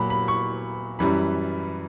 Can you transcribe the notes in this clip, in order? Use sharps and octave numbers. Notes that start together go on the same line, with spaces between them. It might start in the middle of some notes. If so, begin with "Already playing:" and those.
Already playing: A#2 F#3 B5
B5
C#6
F#2 E3 G3 B5